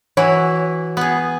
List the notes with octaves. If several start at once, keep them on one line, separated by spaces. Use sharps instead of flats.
E3 F#3 E4 C#5
B3 G#4